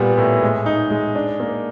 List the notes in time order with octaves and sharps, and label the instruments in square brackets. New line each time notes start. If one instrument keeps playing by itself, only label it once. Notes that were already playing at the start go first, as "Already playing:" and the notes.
Already playing: [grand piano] A#2 G3 B3
A2
G#3
D#4
G#3
D4
A#3